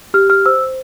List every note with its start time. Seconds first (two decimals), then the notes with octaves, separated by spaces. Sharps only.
0.14 G4 F6
0.30 F6
0.45 C5 E6